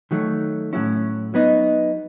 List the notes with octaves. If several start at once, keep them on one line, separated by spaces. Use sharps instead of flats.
D#3 F#3 A3
A2 F#3 C#4 E4
F#3 B3 D#4